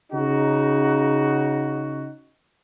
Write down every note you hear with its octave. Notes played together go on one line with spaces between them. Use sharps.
C#3 D#4 F#4